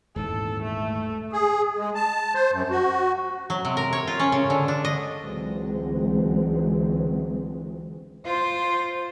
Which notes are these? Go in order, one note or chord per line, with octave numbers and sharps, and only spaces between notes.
D#1 G#2 E3 A4
A3
G#4
G#3
A5
C5
F#2
F#4
F#3
C3
A#4
C#5
F4
C#4
C#3
D3
D4
D#5
C#2 D3 E3 F#3 G#3 C4
F4 C5